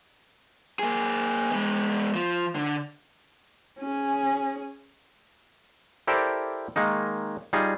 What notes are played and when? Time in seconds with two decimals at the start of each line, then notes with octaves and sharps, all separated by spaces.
0.79 A#3 G#4
1.51 G#3 B3
2.15 F3
2.55 D3
3.79 C#4 G#4
6.07 E4 G4 A4 A#4 C5 D5
6.76 D#3 G#3 A#3 D#4
7.53 G3 D#4 F4 G#4